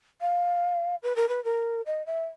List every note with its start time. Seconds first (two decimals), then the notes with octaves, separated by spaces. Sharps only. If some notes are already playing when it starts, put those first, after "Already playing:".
0.21 F5
1.03 B4
1.16 A#4
1.29 B4
1.44 A#4
1.86 D#5
2.06 E5